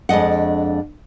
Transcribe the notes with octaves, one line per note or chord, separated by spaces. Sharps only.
F2 G#3 D4 D#5 F#5